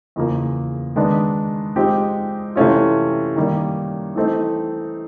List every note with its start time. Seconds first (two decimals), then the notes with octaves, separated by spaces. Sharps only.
0.16 E2 C#3 F3 A#3
0.96 D#3 G#3 B3 D4
1.76 F3 G#3 C4 D#4 G4
2.55 C3 E3 A3 C#4 F4
3.36 D#3 G3 A#3
4.15 E3 A3 C4 D#4